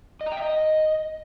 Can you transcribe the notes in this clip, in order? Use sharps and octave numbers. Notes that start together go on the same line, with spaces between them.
D#5
A#5
G5
E5
D#5